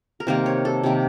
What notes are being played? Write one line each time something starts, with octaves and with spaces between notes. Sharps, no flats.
A#4
C3 D#3 A#3 C5
C#5
A4
C3 D#3 A#3